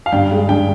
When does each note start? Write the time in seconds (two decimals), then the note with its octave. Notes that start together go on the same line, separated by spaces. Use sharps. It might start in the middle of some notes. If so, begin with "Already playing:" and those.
0.06 F5
0.12 G2 G5
0.32 G#3
0.49 G2 G5